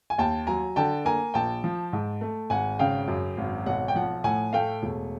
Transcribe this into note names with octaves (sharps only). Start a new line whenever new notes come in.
G#5
D#2 G5 A5
F#3 G#5 A#5
D3 G5 A5
A#3 G#5 A#5
A#1 G5 A5
F3
G#2
A3
G#1 F#5 G#5
C#3 F5 G5
F#2
G#1
B1 F#5
G5
F3 F#5
A2 F#5 G#5
A3 F5 G5
E1